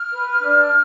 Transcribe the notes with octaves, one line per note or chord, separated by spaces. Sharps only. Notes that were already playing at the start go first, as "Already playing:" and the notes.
Already playing: F6
B4
D4